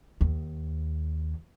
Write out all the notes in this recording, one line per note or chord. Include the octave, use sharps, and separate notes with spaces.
D#2